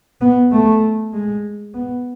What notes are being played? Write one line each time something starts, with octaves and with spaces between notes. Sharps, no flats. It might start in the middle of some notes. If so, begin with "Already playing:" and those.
B3
A3
G#3
B3